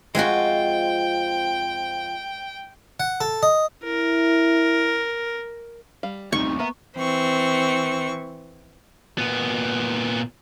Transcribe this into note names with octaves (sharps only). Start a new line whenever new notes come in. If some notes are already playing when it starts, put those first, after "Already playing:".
F2 G#3 C4 F4 F#4 G5
F#5
A4
D#5
E4 A#4
G3 F5
D2 C3 G3 D#4 C#6
A#3 B3 E5 A#5
E3 C4 C#6
A#2 B3